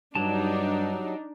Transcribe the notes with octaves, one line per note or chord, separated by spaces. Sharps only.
G2 F#3 D4 D#4 G4 A5